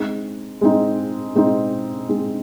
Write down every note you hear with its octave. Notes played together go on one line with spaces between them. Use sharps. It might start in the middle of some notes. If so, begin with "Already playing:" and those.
Already playing: G#3 C4 D#4
G#3 C4 D#4
G#3 C4 D#4
G#3 C4 D#4